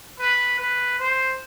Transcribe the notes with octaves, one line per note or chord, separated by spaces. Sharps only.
B4
B4
C5